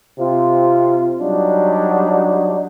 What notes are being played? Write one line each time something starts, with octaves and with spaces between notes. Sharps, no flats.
C3 C4 F4
F#3 G3 D4 D#4